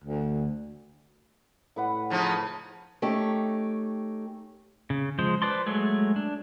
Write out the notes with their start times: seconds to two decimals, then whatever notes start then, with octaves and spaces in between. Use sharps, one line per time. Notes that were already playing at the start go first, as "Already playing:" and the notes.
0.04 D2
1.76 A2 B4 F#5
2.10 C#3 F3 D#4
3.02 A3 C#4 D#4 G4
4.90 C#3
5.19 F3 G#3 C5
5.42 B4 C5 D5 A5 C6
5.66 F#3 G#3 A3 G#4
6.16 D4